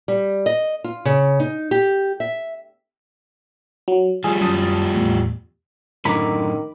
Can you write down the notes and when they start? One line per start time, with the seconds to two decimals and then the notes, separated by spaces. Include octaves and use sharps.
0.08 G3
0.46 D#5
0.84 F4
1.05 C#3
1.40 D#4
1.71 G4
2.20 E5
3.88 F#3
4.24 F3 G3 G#4
4.41 F#2 A5 D#6
4.94 E2 A2
6.05 F#2 A2 D3 D#3 A#5 B5 D6